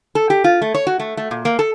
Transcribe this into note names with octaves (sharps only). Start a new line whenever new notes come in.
A4
G4
F4
A3
C#5
F#4
A3
A3
A#2
A#3
A4